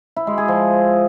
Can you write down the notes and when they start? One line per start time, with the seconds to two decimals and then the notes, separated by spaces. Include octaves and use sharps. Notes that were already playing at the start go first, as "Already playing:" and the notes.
0.16 E4
0.27 G#3
0.38 G#4
0.48 F3